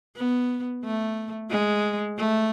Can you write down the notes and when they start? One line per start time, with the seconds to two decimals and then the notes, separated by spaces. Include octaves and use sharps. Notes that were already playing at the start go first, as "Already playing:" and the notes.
0.17 B3
0.85 A3
1.50 G#3
2.18 A3